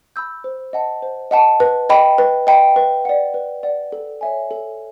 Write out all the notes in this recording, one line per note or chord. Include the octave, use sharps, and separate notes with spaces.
B5 E6 G6
C5
D#5 F#5 A5
C5
D#5 F#5 A5
B4
D#5 G5 B5
B4
D#5 G5 B5
B4
D5 F#5
B4
D5 F#5
A4
C#5 E5 G#5
A4